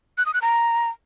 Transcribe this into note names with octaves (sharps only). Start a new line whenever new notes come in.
F#6
D#6
F#6
A#5